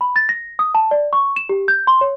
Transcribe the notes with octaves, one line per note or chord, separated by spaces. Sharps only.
B5
A6
A#6
D#6
A5
D5
C#6
E7
G4
G6
C6
C#5